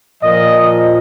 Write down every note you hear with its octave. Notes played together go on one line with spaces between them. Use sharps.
A#2 F3 D#5